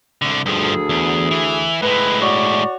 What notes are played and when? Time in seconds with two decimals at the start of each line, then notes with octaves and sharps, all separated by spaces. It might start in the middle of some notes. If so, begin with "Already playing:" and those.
0.22 C2 D3
0.46 D2 G2 F3 G#4 A4
0.89 E2
1.31 E3
1.82 A2 G#3 B4
2.21 F#4 C#5 D5